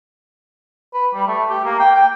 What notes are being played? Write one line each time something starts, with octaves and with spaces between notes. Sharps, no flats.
B4
G3
A3
G4
A#3
G5
G5